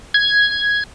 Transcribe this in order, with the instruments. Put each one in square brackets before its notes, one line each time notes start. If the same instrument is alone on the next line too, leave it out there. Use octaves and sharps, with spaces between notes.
[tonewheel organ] G#6